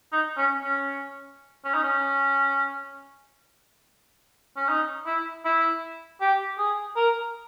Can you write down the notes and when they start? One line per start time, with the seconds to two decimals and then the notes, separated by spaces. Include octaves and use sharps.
0.12 D#4
0.37 C#4
0.63 C#4
1.64 C#4
1.74 D#4
1.83 C#4
4.57 C#4
4.69 D#4
5.06 E4
5.45 E4
6.21 G4
6.58 G#4
6.96 A#4